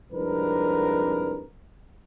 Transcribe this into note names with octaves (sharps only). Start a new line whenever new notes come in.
C2 F2 G#2 D4 A#4 B4